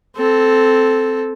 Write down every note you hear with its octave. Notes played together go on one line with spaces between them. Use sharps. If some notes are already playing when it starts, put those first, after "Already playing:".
C4 A4